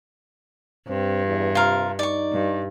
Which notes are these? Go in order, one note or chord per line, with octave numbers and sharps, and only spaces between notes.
G2 C4
E2
C3 F4 A#4
D#4 D5 C#6
G2